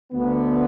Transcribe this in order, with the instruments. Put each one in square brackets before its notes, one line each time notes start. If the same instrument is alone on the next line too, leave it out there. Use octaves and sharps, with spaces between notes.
[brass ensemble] D2 D3 A3 B3